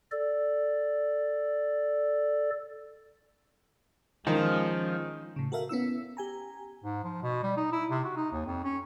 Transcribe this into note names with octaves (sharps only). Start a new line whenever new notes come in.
A4 D5
D#3 F3 G#3 C#4
A2 C#3
F#4 A4 A#4 E5 F5
B3 C#4 E4 E6
G4 G#5 A#5
G#2
F3
B2
G3
D#4
E4
C3
F#4
D#4
D#2
F2
C#4